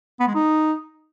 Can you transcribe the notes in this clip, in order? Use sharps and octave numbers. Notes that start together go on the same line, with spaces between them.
B3
G#3
D#4